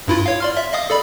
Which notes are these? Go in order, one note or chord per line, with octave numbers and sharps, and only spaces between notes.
G2 E4 F4
C#5 F5
D5 C6 F6
E5
D#5 F5 D#6
A4 D5 B5